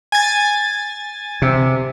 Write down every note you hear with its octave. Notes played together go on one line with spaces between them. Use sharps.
G#5 A6
C3